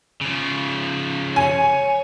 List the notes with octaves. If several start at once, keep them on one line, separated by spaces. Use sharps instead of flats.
C#3 F3
C#5 G#5